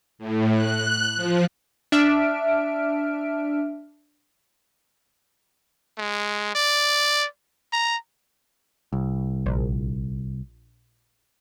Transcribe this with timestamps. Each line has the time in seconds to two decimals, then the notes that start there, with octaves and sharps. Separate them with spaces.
0.18 A2
0.54 F#6
1.15 F3
1.92 D4 E5 F6 D7
5.98 G#3
6.55 D5
7.73 A#5
8.92 C2
9.46 A#1